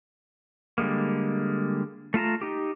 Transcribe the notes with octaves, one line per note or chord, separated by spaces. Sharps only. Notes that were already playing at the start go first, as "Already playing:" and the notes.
D3 G3 G#3 A#3
A3 F4 A5 A#5
D#4 G4